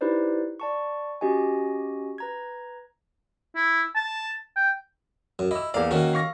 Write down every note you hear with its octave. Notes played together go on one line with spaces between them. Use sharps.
D#4 E4 G4 B4 C5 D5
D5 A5 C#6
C#4 F#4 G4 D#5 G#5
B4 A#5 G#6
E4
A5
G5
F#2
E4 D#5 E6
E2 A#3 D5 F5
D#3 A#3 C#4 F#4
F5 C#6 A#6